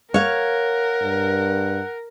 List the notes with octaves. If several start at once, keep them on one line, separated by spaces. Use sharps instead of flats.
A#4 C#5 F5 F#5
G2